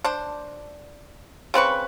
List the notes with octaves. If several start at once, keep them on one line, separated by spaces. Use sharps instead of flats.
D4 C5
C#3 C4 B4 C#6